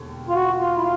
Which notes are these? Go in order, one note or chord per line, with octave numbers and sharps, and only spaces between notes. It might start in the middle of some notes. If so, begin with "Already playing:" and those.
Already playing: E1 D#2 D3
F4
F#4
F4
E4
F4